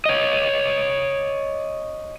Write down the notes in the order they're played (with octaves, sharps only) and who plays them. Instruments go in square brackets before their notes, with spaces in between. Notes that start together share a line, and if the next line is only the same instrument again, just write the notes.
[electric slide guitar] C#5 D#5